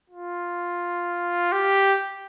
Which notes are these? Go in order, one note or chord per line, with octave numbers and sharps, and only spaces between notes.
F4
G4